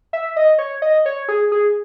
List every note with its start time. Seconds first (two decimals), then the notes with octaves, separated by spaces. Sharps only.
0.13 E5
0.36 D#5
0.59 C#5
0.82 D#5
1.06 C#5
1.28 G#4
1.52 G#4